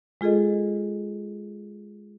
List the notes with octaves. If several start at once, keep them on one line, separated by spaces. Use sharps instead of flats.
G#3 F4 G#4 A4 D#5